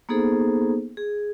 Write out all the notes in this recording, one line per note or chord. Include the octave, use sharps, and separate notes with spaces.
A#3 B3 D#4 G#4 A4 C5
G#4